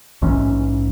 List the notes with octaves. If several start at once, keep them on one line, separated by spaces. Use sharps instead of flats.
A#1 G#2 E3 C#4